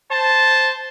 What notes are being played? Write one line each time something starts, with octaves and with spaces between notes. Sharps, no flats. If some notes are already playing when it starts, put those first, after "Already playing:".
C5 A5